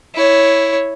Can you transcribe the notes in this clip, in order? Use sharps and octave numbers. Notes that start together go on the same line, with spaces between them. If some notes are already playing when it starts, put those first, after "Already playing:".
E4 C#5